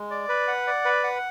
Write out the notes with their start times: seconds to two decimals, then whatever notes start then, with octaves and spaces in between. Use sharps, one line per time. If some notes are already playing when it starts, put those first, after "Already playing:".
Already playing: G#3
0.11 D5
0.29 B4
0.48 F#5
0.67 D5
0.85 B4
1.04 F#5